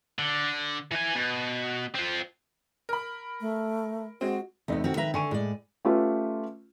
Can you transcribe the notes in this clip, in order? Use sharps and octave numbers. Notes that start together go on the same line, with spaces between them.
D3
E3 G#5
B2
C4 F4
A#4 B5
A3
G#3 C4 F#4
E2 C3 A3 B3 D#4
F1 D#3 C4 F#4
D#3 B4 E5 A#5
D3 G#5 C#6 D#7
A2 G#3 D5
A3 C#4 F4 G4 B4